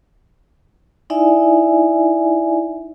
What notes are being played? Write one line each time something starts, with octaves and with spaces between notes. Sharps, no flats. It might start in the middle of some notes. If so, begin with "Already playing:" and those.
D#4 E4 D5 E5 G#5